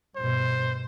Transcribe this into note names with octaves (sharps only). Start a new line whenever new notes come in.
G2 B2 C5